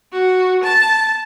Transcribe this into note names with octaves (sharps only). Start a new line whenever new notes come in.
F#4
A5